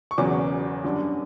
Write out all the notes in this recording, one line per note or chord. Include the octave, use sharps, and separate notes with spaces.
C#6
E1 E2 C#3 F#3 C#4 D6
F#2 D3 G3 D4